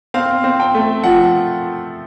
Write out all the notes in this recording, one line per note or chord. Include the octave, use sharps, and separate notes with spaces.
C4 F5
C4
G5
A3
F3 F#5